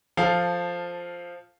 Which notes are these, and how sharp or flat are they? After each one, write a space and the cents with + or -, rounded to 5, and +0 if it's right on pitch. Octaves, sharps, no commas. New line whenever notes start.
F3 +0 A4 +0 F5 +0